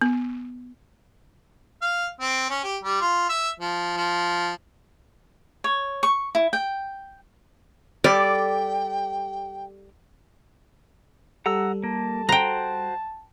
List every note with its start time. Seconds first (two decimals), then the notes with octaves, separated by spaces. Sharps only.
0.01 B3
1.81 F5
2.21 C4
2.50 C#4
2.63 G4
2.83 G3
3.01 F4
3.29 E5
3.59 F3
3.97 F3
5.64 C#5
6.03 C#6
6.35 E4
6.53 G5
8.04 G3 G4 A4 D5 G5
11.46 G3 A4 F#5 A#5 E6
11.84 A#3 A5
12.29 F#4 C5 G5 A#5